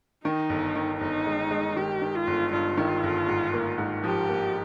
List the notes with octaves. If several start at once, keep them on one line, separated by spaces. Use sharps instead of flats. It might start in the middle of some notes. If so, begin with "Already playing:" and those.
D#3 D#4
G1
D#3
G1 D#4
G#3
G#3
D#3 G4
D#3
F4
G1
G2 F4
D#3
G1
G#2
A#3
G#2
F3 G4
A#3